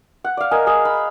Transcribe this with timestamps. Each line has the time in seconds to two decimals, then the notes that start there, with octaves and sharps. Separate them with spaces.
0.24 F#5
0.37 D5 F5
0.51 A#4 D#5 G#5
0.67 G#4 D#5
0.85 B5